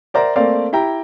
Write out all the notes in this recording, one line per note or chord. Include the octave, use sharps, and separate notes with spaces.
A#4 C5 D5 E5 F#5 A#5
A3 A#3 C4 A#4 D5 F5
E4 G4 G5 A#5